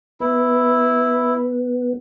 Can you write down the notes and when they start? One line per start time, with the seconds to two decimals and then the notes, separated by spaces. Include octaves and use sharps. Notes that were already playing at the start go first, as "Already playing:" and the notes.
0.20 B3 E4